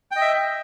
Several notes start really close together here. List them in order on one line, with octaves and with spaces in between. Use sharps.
G5 D#5 E5